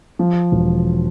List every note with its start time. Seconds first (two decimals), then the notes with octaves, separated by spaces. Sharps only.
0.19 F3
0.52 E1